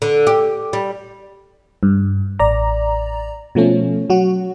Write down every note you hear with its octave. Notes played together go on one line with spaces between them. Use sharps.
D3
G4
G3
G2
A1 D5 A#5
B2 F3 A3 C#4
F#3 F#4